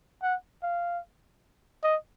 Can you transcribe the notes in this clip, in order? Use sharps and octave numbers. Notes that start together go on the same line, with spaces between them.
F#5
F5
D#5